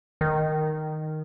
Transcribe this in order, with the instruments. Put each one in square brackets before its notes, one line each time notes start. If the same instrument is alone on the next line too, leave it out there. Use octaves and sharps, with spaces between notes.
[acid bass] D#3